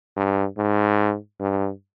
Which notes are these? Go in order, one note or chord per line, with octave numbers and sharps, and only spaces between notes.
G2
G#2
G2